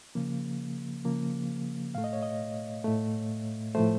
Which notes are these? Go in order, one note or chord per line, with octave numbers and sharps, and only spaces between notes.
C#3 F3 A#3
C#3 F3 A#3
A2 A3 F5
D#5
C#5
D#5
A2 A3
A2 F3 A3 C5